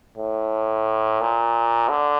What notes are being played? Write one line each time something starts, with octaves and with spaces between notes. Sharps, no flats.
A2
A#2
D3